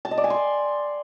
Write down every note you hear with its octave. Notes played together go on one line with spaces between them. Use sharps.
A5
D#5
D5
G#5
C6